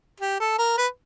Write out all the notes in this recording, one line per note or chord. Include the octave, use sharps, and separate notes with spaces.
G4
A4
A#4
B4